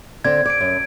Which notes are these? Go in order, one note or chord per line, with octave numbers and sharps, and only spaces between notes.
D3 C4 G#6
D5 G#6 D7
F#2